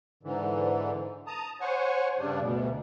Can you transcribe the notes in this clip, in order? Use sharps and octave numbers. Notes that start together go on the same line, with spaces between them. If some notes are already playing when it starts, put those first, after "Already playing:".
G#2 D3 E3
A5 A#5 D#6
C5 C#5 F#5 G#5 C#6
G2 C#3 G3 D4
D2 B2